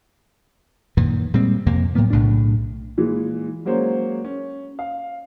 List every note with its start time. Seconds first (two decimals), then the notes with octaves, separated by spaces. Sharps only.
0.97 F#2 A#2 D#3 E3
1.34 A#2 G3 G#3 C4
1.66 F2 C3 A#3
1.95 A2 F#3 A#3 B3
2.10 B1 A2 C#3 D4
2.97 A#2 E3 G#3
3.65 F#3 G#3 A#3 C#4 C5 C#5
4.25 C#4
4.79 F5